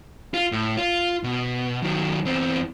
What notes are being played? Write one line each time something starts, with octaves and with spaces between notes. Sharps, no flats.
F4
A2
F4
B2
D#3 F#3
E2 C4